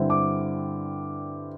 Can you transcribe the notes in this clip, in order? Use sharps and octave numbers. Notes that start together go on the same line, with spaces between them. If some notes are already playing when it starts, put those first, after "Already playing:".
Already playing: G2 D3 C4 E4
D6